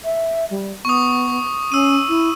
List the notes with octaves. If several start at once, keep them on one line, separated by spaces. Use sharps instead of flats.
E5
G3
B3 C#6 D#6
C#4 E6 D#7
E4